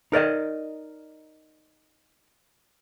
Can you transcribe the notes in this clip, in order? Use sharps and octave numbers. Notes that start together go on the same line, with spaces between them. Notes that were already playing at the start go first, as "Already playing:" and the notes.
D#4 A#4 D5 D#5